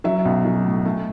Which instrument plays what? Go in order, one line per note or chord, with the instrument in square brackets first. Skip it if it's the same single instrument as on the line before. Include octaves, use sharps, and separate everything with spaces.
[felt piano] F#3 E5
B1
F#3
A2
A3